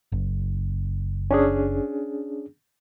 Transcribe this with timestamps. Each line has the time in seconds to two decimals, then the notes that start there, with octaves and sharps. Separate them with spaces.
0.12 F#1
1.31 C#4 D4 G#4